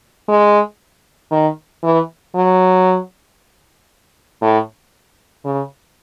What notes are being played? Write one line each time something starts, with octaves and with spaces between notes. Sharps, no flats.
G#3
D#3
E3
F#3
A2
C#3